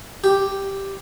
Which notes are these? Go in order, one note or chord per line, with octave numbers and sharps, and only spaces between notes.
G4